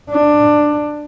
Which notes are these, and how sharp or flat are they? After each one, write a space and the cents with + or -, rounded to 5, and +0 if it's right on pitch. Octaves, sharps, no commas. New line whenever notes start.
D4 +10